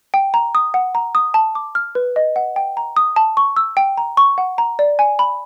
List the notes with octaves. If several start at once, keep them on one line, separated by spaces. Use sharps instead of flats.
G5
A#5
D#6
F#5
A#5
D#6
A5
D6
F6
B4
D#5
F#5
G5
A#5
D#6
A5
C#6
E6
G5
A#5
C#6
F#5
A#5
D5
G#5
B5